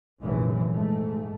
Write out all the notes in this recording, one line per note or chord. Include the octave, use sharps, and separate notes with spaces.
F1 A#1 F#2 C#3 E3
G#2 A3